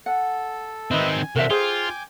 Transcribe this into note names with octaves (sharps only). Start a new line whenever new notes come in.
A4 F#5
D#3 C4 B4 D#5 E5
G#5
C3 D4 F#4 A#4 C5 E5
F4 G#4 C5 G5 G#5 D6